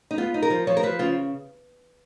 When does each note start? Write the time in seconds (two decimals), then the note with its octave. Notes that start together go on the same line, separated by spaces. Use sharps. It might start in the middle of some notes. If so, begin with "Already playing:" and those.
0.11 D#4
0.18 B3 F4
0.34 D#4
0.42 A#4
0.50 F3
0.67 F3 C#5
0.77 A#4
0.83 F3 B4
0.99 C#3 F4